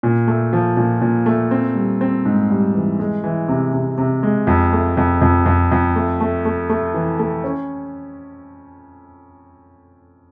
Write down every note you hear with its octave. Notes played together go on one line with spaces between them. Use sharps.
A#2
A3
F3
A#2
A#2
A3
C4
G3
C4
G#2
G3
E3
G#3
E3
C3
C3
C3
G#3
F2
A3
F2
F2
F2
F2
A3
A3
A3
A3
E3
A3
C#4